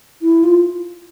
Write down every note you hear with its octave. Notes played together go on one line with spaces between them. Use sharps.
E4
F4